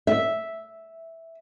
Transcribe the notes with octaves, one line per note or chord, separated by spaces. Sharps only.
E5